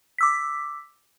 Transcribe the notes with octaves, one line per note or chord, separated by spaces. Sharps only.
D6 E6 B6